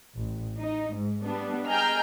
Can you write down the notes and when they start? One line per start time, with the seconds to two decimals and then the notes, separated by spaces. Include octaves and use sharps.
0.17 A1
0.57 D#4
0.94 G#2
1.23 G3 B3 D4
1.68 G#4 D#5 G5 A#5 F6 G6